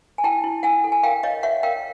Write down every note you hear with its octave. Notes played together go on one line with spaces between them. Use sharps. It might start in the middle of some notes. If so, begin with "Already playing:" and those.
G#5
E4 G5 A5
E4
E4 F#5 G#5
A4
G#5
A#4 F5 G5
C#5 D#5 F5
C#5 E5 F#5
A#4 F5 G5